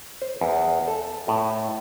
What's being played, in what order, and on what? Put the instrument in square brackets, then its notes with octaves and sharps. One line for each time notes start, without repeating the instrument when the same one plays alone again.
[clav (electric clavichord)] C5
E2
A4
A2